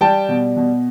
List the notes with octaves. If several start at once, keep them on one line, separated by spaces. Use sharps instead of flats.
G3 G5 A5
B2
B2